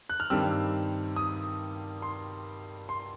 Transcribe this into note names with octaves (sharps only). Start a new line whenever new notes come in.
F#6
F6
G2 D#3 G3 C4 E6
D#6
C6
C6